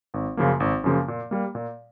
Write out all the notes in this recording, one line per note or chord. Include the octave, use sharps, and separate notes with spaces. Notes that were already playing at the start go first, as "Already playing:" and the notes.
G#1
F#2 C#3 F3 A#3
G#1
F#2 C#3 F3 A#3
A#2
G3 A#3
A#2